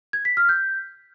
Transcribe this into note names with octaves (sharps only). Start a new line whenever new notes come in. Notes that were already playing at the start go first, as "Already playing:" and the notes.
G#6
B6
F6
G6